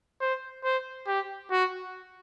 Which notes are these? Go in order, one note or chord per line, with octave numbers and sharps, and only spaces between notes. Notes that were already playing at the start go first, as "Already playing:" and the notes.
C5
C5
G4
F#4